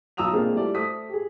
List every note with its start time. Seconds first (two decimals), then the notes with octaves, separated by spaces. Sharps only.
0.17 B1 A#5 D#6 E6 F7
0.33 G#3 A#3 C4 D4 F4 G#4
0.55 G3 A3 E4 D5
0.75 A3 C5 D#6 B6
1.09 G4 G#4